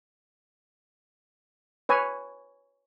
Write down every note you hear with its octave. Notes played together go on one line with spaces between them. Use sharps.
B4 C#5 G#5